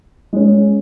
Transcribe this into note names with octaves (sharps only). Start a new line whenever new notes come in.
G#3 C#4